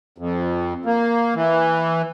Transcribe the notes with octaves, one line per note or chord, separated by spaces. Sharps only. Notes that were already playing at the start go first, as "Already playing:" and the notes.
F2
A#3
E3